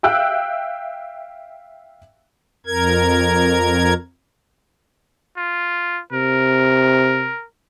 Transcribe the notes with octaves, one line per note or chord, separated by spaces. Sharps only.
E5 F5 G5 E6 F#6
F2 A#4 G#6
F4
C3 A#4